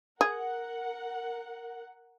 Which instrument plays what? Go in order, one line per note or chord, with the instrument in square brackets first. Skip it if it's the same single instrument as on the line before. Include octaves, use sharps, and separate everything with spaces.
[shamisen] G#4 [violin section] A#4 F#5